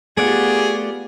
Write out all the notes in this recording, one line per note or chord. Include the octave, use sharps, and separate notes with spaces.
A3 B3 F4 G4 G#4 D5 F#5